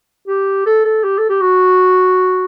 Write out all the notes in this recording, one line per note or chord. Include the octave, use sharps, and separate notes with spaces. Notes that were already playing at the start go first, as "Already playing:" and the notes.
G4
A4
A4
G4
A4
G4
F#4